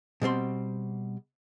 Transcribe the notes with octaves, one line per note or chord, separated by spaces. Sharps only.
B2 G3 C4 C6